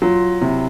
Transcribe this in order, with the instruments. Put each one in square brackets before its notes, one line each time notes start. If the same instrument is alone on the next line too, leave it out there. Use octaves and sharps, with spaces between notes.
[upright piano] F#3 [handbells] F4
[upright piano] C3 [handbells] E4